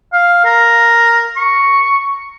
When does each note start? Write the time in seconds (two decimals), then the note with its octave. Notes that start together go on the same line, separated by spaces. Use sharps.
0.13 F5
0.45 A#4
1.37 C#6